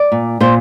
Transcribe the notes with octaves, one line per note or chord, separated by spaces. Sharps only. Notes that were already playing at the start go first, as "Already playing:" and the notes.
Already playing: D5
A#2
A#2 C5